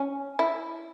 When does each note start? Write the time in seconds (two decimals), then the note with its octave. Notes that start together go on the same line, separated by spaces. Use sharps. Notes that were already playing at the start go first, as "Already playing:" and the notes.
Already playing: C#4
0.39 E4